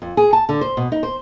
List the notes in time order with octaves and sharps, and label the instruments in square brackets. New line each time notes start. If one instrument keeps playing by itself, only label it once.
[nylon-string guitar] F2
G#4
A5
D3
C5
B2
D#4
C5